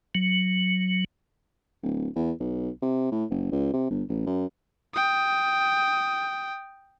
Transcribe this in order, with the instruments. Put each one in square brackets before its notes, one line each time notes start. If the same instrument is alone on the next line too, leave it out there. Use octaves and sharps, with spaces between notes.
[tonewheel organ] F#3
[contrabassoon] D1
E2
B1
C3
A2
F#1
C#2
C3
G1
A1
F#2
[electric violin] G5 D#6